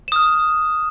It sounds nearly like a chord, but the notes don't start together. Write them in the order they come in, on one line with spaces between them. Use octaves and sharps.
E7 D#6 F6